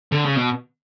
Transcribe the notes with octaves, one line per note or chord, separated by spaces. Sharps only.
D3
C#3
B2